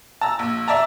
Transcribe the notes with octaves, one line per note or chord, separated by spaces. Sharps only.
A5 A#5 E6
A#1
D5 E5 A5 A#5